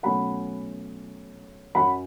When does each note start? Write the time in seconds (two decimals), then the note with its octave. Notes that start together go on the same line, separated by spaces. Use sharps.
0.03 B2 F#3 A3 C#4 F#5 B5
1.75 F#2 F#3 C#4 F#5 B5